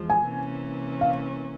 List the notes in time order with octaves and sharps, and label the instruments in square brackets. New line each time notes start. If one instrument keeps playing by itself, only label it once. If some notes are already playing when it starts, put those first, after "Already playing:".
Already playing: [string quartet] E2 F3 G#3
[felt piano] G#5
[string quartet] C3 E3 A#3 C#4
[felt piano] F5